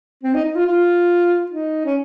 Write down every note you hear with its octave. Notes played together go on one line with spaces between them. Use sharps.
C4
D#4
D#4
F4
F4
D#4
C#4